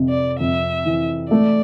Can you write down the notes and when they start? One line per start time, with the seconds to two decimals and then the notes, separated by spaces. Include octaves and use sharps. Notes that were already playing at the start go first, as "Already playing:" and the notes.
Already playing: F2 C3
0.09 D5
0.40 F2 E5
0.85 E3
1.31 A3 D5